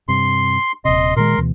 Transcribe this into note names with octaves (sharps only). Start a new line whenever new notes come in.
G2 C3 C6
D#1 C3 D#5 C6
A#2 D#3 G#3 A#4 C6
D2 B2 E3